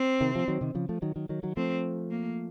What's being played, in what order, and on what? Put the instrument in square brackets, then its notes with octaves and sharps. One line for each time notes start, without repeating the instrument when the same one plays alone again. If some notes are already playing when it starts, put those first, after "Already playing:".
Already playing: [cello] C4
[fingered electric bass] C3 D#3
F3
D#3 F#3
C3 D#3
C#3 F3
F3 A3
D#3 F#3
D#3 F#3
D#3 F#3
D#3 F#3
[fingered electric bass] F3 A3 [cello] C4
[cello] A#3